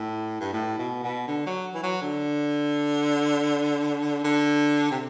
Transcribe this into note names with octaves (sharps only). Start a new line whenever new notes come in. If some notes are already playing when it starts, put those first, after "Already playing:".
Already playing: A2
G2
A2
B2
B2
D3
F#3
E3
F#3
D3
D3
C3